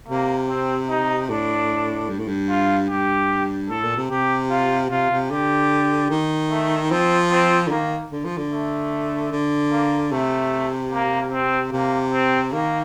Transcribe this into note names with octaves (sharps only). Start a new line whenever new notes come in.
C3 A#3
C4
D#4
A2 D4
G2
A2
G2
F4
G2 G4
A2 A4
A#2
C3
C3 G4
F4
C3 F4
C3
D3 G4
D#3
A3
F3 C4
C4
D3
D#3 A#3
D3
F3
D3
A3
D3
A#3
C3 A3
A#3
C4
C3 A#3
C4
D#3 A#3